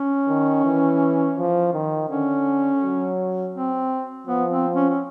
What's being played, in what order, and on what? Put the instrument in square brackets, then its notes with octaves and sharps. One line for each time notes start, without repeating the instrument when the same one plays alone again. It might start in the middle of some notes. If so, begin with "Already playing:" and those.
Already playing: [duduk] C#4
[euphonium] D#3
E3
F3
D#3
[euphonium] D3 [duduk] C#4
[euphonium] F#3
[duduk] C4
[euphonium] F3 [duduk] B3
[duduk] C4
C#4
C#4